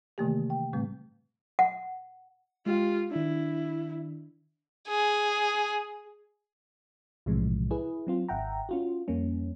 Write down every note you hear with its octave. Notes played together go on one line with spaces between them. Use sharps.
C3 D#3 E3 A3 A#3 G4
G5
A2 C#3 G3 A3 C4
F#5
G#3 F4 G4
D#3 D4 E4
G#4
B1 A2 C3 E3 F3 G#3
E4 G#4 B4
F#3 C4 F4
G#1 E5 F#5 G5 A#5
C#4 F4 F#4
F2 G3 A#3 C#4